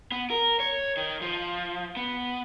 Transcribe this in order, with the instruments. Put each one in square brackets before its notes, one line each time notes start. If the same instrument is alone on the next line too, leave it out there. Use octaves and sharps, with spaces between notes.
[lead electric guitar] B3
A#4
C#5
D#3
F3
B3